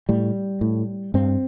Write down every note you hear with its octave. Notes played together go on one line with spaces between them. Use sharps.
A2 G3
A2
G2 C4